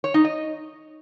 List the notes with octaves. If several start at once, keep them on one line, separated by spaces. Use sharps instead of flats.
C#5
D#4
D#5